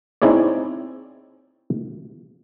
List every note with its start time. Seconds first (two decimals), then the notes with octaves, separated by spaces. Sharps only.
0.22 C4 D#4 E4 G#4 C#5 D5